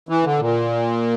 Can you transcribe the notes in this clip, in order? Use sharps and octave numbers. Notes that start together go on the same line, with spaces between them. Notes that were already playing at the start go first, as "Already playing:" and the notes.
E3
D3
A#2